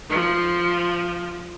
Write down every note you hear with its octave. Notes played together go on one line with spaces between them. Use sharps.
F3